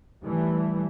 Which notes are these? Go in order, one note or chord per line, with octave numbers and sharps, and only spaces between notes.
E3 G3 A3